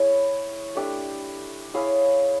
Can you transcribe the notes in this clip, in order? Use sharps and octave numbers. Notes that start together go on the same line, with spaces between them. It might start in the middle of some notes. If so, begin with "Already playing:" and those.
Already playing: E4 G#4 C#5 E5
A3 D4 G4
E4 G#4 C#5 F5